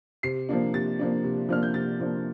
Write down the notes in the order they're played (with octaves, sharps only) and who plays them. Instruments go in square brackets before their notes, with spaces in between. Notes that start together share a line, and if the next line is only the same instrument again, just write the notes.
[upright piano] C3 C7
F3 A#3 D4
C3 A6
F3 A#3 D4
C3
F3 A#3 D4 F6
G6
C3 A6
F3 A#3 D4